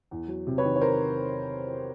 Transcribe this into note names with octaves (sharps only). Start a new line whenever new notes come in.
E2
F#3
C3
B4 C#5
D#3
C#5
A#4 C5